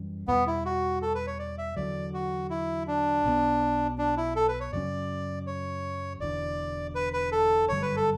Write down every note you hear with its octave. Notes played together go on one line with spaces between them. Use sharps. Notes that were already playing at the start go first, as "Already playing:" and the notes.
Already playing: F#2 E3 G3 C#4
E2 B2 G3 B3
E4
F#4
A4
B4
C#5
D5
E5
E2 D3 F#3 D5
F#4
E4
D4
B1 B2 F#3 B3
D4
E4
A4
B4
C#5
F#2 C#3 F#3 C#4 D5
C#5
E1 E2 D3 D5
B4
B4
A4
G1 F#2 D3 G3 C#5
B4
A4